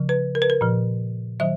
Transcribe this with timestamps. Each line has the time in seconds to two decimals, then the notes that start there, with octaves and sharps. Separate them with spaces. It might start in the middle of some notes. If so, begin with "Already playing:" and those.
Already playing: C#3 F3
0.09 B4
0.35 A#4
0.42 B4
0.50 A#4
0.61 A#2 F3
1.40 D#3 F#3 E5